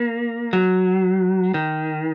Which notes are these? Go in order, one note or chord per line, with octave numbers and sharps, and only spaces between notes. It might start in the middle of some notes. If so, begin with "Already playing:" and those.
Already playing: A#3
F#3
D#3